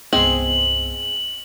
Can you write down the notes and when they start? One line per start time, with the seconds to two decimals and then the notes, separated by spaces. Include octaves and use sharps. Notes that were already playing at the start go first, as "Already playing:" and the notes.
0.13 C2 G2 G#3 B3 C4 G#4 F#7